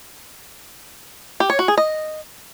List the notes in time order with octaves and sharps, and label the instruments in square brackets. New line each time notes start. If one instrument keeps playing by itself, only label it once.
[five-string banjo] G4
C#5
F#4
G#4
D#5